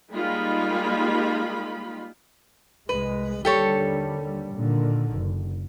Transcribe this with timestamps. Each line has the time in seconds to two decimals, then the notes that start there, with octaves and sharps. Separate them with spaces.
0.12 G3 G#3 A#3 D#4 F4 B5
2.89 C2 G#3 B4
3.45 D#2 D3 G3 G4 A4 C#5
4.54 A#2 D3 D#3
5.13 F#1